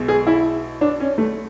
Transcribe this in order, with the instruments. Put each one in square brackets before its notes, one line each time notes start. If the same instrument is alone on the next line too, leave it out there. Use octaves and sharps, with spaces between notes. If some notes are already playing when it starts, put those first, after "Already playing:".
Already playing: [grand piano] B1 B2 G#3
[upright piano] G#4
E4
D4
C#4
A3